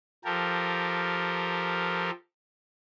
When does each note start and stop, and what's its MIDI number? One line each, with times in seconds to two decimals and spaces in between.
0.25 2.10 53
0.25 2.10 67
0.25 2.10 69
0.25 2.10 70